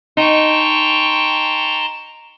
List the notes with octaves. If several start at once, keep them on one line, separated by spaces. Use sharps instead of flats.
D#4 G5 A5 A#5 C6 C#6